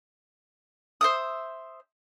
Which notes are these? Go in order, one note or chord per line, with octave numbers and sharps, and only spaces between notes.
C5 E5 D#6